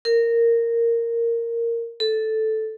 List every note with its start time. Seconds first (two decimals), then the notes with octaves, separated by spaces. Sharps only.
0.05 A#4
2.00 A4